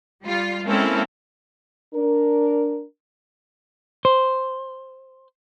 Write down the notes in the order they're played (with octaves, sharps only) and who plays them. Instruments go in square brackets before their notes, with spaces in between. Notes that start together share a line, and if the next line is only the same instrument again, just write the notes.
[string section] G3 F4
G#3 A#3 C4 C#4 E4 A4
[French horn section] D4 A#4
[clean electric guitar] C5